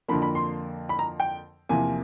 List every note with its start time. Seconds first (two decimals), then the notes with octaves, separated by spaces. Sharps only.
0.08 F2 D3 F3 A#3 B5
0.22 B5
0.35 C6
0.89 B5
0.99 A#5
1.20 G5
1.69 E2 C3 F3 A#3 G#5